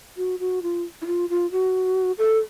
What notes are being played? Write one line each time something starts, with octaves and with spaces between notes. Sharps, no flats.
F#4
F#4
F4
E4
F4
F4
F#4
A4